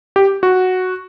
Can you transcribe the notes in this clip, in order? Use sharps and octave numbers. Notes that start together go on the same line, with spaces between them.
G4
F#4